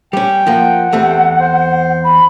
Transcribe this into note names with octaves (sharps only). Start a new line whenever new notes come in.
G3 C#4 G5
F3 A#3 F#5
E2 A3 C4 G4
C5
B5